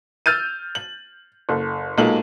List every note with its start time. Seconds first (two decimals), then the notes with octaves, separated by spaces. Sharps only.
0.26 E6 F6 G6 A6 D#7
0.75 F#7
1.49 F#1 A4
1.98 B1 A#2 G#3 A#3 A4 F#7